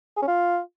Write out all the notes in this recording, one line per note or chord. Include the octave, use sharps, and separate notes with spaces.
G#4
C#4
F4